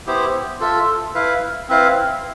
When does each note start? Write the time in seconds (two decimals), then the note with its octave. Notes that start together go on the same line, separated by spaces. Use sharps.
0.07 B3 E4 G4 C5
0.61 F4 A4 E5
1.15 E4 B4 F5
1.69 C4 E4 B4 F5